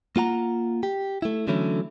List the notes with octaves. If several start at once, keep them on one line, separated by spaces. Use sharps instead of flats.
A#3 F4 F#5 A#5
G4
A3 E4
D3 E3 F#3 A3 C#4 E4